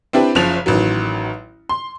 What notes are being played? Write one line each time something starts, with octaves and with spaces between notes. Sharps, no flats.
C4 D4 E4 G4 B4
F#1 C#3 F3 F7
A1 D#3 F#3
C6